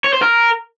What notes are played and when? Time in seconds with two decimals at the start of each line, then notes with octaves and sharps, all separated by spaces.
0.04 C#5
0.13 C5
0.22 A#4